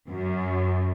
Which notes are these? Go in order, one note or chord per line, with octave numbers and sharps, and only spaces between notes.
F#2